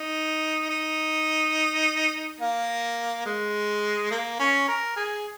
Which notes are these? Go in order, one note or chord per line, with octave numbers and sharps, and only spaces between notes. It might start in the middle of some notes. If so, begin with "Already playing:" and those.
Already playing: D#4
D#4
A#3
G#3
A#3
C#4
A#4
G#4